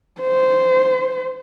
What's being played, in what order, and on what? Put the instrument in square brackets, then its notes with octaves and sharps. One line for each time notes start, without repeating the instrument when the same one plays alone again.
[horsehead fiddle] C5